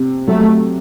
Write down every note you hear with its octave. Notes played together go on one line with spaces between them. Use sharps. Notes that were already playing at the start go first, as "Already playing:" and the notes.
Already playing: C3
F#3 A3